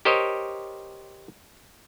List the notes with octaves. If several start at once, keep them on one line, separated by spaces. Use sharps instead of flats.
G4 A#4 C5 C#5 D#5